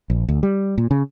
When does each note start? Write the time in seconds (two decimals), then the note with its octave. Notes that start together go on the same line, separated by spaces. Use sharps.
0.10 A#1
0.29 D2
0.43 G3
0.78 A#2
0.91 C#3